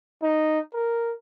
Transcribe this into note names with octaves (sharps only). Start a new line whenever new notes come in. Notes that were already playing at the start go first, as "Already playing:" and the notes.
D#4
A#4